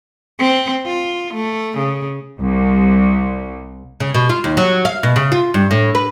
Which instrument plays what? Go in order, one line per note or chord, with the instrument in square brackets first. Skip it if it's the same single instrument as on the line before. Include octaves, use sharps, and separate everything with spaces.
[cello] C4
F4
A3
C#3
[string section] C2
[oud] C#3
B2
F4
D#2
F#3
F5
B2
C#3
F4
G2
A2
B4